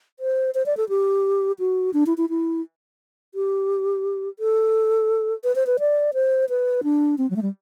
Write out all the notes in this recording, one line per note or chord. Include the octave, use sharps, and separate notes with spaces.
C5
C5
D5
A4
G4
F#4
D4
E4
E4
E4
G4
A4
B4
C5
B4
D5
C5
B4
D4
C4
F#3
A3
G3